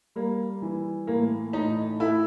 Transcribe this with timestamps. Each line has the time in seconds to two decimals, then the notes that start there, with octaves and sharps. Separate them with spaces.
0.16 G3 A#3
0.62 E3
1.07 A2 A#3
1.53 A2 D#4
2.00 A3 E4